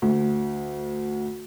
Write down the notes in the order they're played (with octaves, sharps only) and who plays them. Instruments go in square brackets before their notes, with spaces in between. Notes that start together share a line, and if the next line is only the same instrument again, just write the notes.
[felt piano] D2